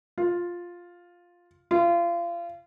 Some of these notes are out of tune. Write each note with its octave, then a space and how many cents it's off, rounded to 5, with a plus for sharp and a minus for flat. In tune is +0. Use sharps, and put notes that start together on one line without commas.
F4 +5
F4 -30